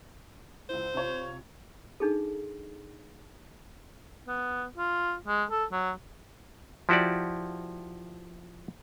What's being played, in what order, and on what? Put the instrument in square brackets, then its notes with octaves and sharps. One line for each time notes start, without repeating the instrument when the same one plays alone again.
[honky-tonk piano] C#2 E4 [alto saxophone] C5
[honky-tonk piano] C3 F4 C#5
[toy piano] D4 D#4 G#4 A4
[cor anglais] B3
F4
G#3
A4
F#3
[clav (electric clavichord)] F3 E4 F#4 G4 D5